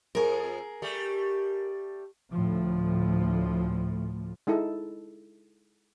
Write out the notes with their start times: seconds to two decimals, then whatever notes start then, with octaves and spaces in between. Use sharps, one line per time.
0.15 F2 G#4 A#4
0.82 G3 A3
2.31 D2 A2 F3
4.47 G#3 D#4 E4 A4